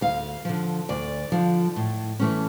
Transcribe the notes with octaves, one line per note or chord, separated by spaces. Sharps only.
D2 F5
D3 F3
D2 D5
D3 F3
A2
E3 A3 C#4